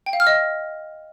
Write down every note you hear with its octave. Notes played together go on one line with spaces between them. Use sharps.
G5
F5
F6
D#5